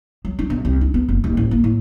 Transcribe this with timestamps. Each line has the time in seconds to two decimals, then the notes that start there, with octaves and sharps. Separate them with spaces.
0.25 F#3
0.39 D4
0.50 B1
0.65 C2
0.81 D4
0.94 B3
1.09 F#1
1.24 D#1
1.37 A1
1.51 A#3
1.64 A2